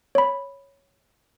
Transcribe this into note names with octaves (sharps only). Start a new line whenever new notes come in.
C#5 B5